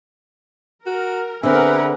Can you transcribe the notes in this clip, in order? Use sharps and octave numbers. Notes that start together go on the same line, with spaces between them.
F#4 A#4
D3 C4 G#4 A#4 B4 E5 F#5